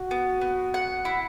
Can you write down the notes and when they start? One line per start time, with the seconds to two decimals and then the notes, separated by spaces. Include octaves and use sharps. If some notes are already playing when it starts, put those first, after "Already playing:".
Already playing: F#4
0.11 B3
0.41 B3
0.74 F#5
1.05 E4